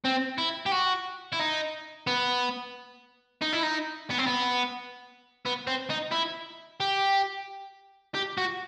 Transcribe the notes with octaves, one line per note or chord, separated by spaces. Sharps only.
C4
E4
G4
F#4
E4
D#4
B3
D#4
E4
D#4
B3
C4
B3
B3
C4
D#4
E4
G4
G4
F#4